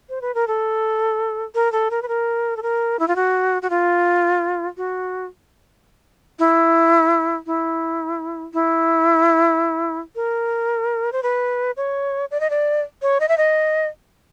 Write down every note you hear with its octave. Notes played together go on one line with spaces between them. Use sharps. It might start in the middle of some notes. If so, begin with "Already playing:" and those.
C5
B4
A#4
A4
A#4
A4
A#4
B4
A#4
A4
A#4
E4
F4
F#4
F#4
F4
F#4
E4
E4
E4
A#4
C5
B4
C#5
D5
D#5
D5
C#5
D#5
E5
D#5